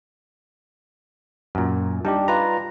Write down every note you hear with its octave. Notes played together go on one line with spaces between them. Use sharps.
F#2 A#2
G3 D4 D#4 G4
F4 B4 A#5